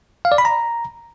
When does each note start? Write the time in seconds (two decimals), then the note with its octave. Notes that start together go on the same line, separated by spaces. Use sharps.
0.25 F5
0.32 D5
0.38 B5
0.45 A#5